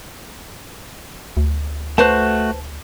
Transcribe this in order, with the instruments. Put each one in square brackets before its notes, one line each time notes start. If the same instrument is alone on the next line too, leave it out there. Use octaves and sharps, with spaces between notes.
[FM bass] D2
[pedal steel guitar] A3 F#4 [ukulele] B4 C5 A5